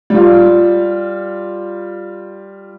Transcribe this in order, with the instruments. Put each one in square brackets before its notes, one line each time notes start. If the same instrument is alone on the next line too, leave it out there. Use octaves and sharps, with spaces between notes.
[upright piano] G3 F4